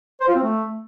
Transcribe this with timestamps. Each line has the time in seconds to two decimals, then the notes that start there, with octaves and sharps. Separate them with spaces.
0.21 C5
0.28 F4
0.35 C4
0.43 A3